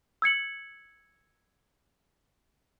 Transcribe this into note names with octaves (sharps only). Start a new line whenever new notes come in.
E6 G#6 C#7 F#7